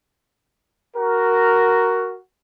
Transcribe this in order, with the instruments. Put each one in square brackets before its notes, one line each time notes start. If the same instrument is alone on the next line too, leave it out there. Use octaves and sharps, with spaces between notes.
[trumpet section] F#4 A#4